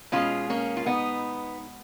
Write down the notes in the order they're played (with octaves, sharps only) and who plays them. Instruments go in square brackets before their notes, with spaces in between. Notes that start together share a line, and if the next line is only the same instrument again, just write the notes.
[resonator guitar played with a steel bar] B2 G#3 C#4 F4
A#3 C#4
F4
B3 D#4